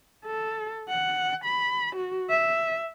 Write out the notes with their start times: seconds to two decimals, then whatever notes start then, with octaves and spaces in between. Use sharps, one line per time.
0.26 A4
0.89 F#5
1.45 B5
1.96 F#4
2.30 E5